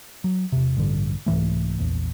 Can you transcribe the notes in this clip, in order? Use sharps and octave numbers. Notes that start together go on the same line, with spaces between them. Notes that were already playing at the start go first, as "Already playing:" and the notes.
F#3
E1 C3
A1 G2 D3
C2 G#2 E3 A3
A#1 E2